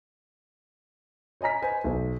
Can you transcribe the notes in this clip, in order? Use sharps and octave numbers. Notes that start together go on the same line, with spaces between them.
C#5 D#5 G#5 A#5 B6
B4 C5 G#5
B1